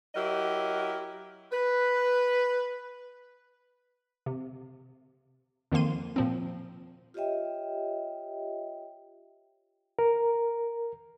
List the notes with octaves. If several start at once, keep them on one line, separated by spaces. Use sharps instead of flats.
F#3 E4 G4 A#4 D#5 F#5
B4
C3
F2 D#3 F3 A#3 C6 D#7
A#2 F3 C4
F4 G4 C#5 D#5 E5 G5
A#4